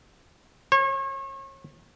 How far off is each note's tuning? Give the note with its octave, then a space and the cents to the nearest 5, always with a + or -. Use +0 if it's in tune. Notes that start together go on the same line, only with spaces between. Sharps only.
C#5 -35